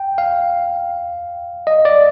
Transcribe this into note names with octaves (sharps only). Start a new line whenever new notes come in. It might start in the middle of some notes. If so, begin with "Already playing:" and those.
Already playing: G5
F5
D#5
D5